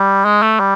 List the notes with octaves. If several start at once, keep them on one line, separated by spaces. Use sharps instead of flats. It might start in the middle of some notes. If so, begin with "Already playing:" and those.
Already playing: G3
G#3
A3
G3